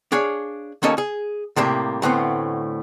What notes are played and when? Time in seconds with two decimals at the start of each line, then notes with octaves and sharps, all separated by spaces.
0.12 D4 G#4 C#5 F5
0.83 D#2 A#3 C#4 A4 D#5
0.98 G#4
1.56 A2 C3 G3 A#3
2.02 D2 A2 B3 C4